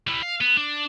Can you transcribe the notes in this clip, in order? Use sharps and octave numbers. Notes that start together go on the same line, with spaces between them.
G3 E4
F5
B3
D4